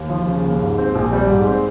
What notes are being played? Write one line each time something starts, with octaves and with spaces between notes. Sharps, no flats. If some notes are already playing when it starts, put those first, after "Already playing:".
Already playing: D#2
F3
C#3
D#2
G#2
C4
A#1
G3
G#2
C4